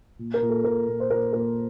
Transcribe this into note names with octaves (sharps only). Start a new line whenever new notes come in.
A#2
A#4
A#2
A4
A#2 A#4
A#2
C5
A#2 A#4
A#2 A#4